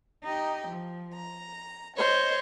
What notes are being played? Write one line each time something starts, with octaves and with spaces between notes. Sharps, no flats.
D#4 G4
F3
A#5
C5 C#5 D#5